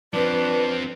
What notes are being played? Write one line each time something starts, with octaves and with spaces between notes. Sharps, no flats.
F3 C4 D4 B4